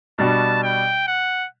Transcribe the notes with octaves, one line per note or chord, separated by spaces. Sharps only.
B2 G3 D4 F#4 A5
G5
F#5